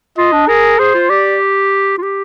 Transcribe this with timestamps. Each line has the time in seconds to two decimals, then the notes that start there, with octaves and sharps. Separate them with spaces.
0.18 F4 D#5
0.32 D4
0.48 G#4 A#4
0.79 G#4 C5
0.94 F4
1.09 G4 D5
1.98 F4
2.02 G4